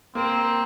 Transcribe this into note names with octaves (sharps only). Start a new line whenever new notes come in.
A#3 C4